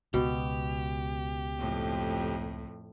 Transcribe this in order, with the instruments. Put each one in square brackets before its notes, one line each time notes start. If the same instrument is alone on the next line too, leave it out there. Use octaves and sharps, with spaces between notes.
[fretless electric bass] C#2 B3 [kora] B2 [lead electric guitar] G4
[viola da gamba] F2 A2